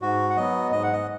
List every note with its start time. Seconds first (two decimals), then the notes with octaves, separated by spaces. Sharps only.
0.01 G#2 F#4
0.30 F#5
0.36 F#3 B3 D#5
0.71 G#2 D#5
0.83 F#5
0.93 D#5